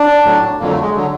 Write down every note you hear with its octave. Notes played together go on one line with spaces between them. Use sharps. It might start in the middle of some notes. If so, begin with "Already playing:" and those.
Already playing: D4
A2 F#3
F2 D3 F#3 A#3
A3
G#3
D3 F#3